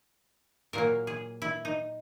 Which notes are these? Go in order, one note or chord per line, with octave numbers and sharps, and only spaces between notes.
A#2 F#3 A#3 A#4
G#4
E4
D#4